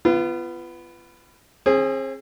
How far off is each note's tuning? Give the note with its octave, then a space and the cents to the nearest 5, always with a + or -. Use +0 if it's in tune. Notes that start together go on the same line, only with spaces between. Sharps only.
B3 +10 F4 -30
C4 +40 G#4 +0